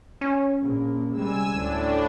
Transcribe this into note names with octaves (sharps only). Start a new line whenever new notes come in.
C#4
A#1 A#3
C3 G3 G#3 G#5 E6
D2 A2 D4